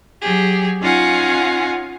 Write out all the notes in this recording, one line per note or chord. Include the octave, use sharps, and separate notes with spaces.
F#3 G4 G#4
C#4 D#4 F4 F5 F#5 G#5